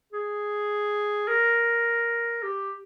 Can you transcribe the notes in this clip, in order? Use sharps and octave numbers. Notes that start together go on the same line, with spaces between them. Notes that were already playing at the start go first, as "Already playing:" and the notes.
G#4
A#4
G4